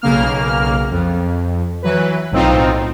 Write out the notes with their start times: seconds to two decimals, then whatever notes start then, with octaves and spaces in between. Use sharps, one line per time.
0.02 B1 C#3 A#3 F6
0.91 F2
1.82 E3 F#3 B4
2.32 B1 A2 C4 D#4 F4